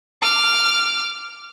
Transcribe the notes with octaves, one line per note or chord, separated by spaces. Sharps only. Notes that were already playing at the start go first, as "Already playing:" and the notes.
D6 F6